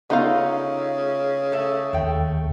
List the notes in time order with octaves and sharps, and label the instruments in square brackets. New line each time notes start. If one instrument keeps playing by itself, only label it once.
[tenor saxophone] C#3 [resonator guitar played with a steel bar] A3 D#4 F4 [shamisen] B3 F5
[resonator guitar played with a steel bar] A3 E5
[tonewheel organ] D#2 [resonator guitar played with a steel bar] A3 G5